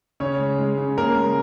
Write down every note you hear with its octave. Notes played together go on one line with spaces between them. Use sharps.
C#3 C#4 C#5
G#3
G#3
C#3
C#3 A#3 A#4
G#3